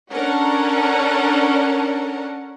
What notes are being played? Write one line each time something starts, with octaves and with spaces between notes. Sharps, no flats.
C#4 D4 A4 A#4 F#5